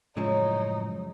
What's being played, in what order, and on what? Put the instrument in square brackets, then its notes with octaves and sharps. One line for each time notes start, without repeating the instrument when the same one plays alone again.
[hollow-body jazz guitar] F#2 C#3 F3 [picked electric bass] A2 G#3 [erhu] D#4 [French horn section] C#5